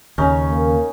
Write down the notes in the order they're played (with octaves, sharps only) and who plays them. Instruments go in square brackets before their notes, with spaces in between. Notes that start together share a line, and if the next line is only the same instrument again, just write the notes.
[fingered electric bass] D#2 C#3 [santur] C#4 D#4
[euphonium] A#3